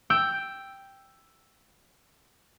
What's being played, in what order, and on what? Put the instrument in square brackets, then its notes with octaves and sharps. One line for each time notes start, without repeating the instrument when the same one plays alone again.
[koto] G5 [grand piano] E6